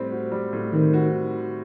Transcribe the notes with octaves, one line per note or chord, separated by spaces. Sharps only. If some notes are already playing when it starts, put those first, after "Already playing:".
Already playing: A2 G3 C4
F#4
G3
A2
D#3 C4
F#4